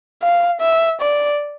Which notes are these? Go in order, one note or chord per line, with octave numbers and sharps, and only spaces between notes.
F5
E5
D5